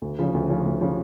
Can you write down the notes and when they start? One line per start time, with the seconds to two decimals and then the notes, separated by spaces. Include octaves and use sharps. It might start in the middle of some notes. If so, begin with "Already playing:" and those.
0.02 D2
0.19 C#3 F3 C#4
0.34 D2
0.49 C#3 F3 C#4
0.66 D2
0.81 C#3 F3 C#4